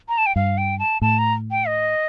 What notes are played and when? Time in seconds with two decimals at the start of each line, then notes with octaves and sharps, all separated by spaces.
0.09 A#5
0.18 A5
0.26 G5
0.36 G2 F5
0.58 G5
0.79 A5
1.02 A2 A5
1.19 A#5
1.51 G5
1.68 D#5